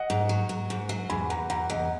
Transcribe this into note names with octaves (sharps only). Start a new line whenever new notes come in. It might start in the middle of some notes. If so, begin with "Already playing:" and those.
Already playing: D#5 F#5
G#2
F#3
F#3
G#2
F#3
E2 G#5 B5
E2 F#5 A#5
E2 F#5 A#5
E2 D#5 F#5